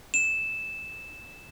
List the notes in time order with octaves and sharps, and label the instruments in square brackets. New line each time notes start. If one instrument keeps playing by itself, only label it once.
[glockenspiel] E7